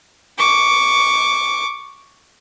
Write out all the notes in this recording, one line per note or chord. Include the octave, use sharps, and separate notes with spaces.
C#6 D6